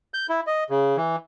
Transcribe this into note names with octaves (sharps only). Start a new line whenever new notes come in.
G6
E4
D#5
C#3
E3